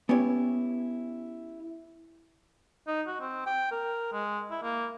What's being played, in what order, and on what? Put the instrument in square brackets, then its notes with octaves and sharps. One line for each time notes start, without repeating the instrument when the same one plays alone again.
[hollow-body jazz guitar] B3 C#4 E4 G4 C#5
[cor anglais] D#4
F#4
C4
G5
A#4
G#3
E4
A#3